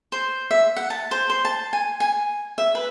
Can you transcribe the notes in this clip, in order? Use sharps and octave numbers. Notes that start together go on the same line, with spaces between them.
C5
E5
F#5
A5
C5
C5
A5
G#5
G#5
E5
B4